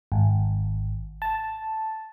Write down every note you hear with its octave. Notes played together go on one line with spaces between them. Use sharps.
G#1
A5